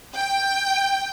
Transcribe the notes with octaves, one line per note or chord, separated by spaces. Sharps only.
G5